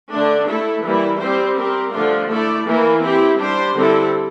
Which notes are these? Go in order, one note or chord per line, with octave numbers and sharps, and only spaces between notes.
D3 A3 D4
A3 E4 A4
E3 G3 A#3 E4
G3 C4 G4 C5
C4 G4 A#4
D3 F3 A3 D4 F4
A3 E4 A4 D5
E3 A#3 E4 A#4
C4 E4 G4
G3 D4 G4 C5
D3 G3 C4 E4 A4